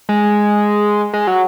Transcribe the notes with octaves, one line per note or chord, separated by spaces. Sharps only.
G#3
G#3
F#3